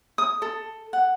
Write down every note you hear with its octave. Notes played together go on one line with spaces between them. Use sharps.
D#6
A4
F#5